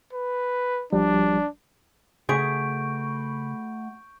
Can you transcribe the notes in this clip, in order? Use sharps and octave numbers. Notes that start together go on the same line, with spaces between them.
B4
G#1 F3 G3 D4
C#3 A3 F#4 G#4 B4 C#6 G6 D7